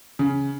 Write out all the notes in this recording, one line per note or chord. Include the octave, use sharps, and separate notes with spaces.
C#3